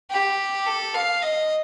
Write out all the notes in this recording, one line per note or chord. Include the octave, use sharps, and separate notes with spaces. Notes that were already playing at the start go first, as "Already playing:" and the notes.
G4
A4
F5
D#5